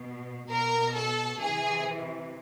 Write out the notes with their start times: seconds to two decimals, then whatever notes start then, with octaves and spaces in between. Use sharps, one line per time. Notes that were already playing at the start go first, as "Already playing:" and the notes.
Already playing: B2
0.49 B2 A#4
0.95 A4
1.41 C3 E3 G#4